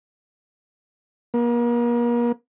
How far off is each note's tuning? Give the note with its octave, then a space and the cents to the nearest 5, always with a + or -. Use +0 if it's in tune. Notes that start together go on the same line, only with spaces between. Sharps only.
A#3 +40